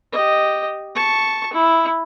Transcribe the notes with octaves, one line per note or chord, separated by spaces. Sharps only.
G4 D#5
A5 C#6
E4